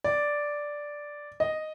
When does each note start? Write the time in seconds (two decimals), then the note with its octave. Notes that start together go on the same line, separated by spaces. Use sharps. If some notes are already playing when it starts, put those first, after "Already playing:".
0.04 D5
1.40 D#5